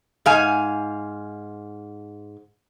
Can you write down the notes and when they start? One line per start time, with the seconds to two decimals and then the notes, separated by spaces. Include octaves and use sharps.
0.26 G#2 F5 G#5